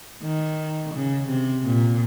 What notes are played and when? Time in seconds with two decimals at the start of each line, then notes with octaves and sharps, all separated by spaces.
0.22 D#3
0.94 C#3
1.28 C3
1.65 A#2